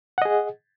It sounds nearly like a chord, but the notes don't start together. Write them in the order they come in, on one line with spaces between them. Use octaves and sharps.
F#5 D#5 G#4